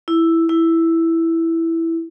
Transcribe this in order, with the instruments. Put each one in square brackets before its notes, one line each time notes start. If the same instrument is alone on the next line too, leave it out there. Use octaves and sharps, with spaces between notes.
[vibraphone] E4
E4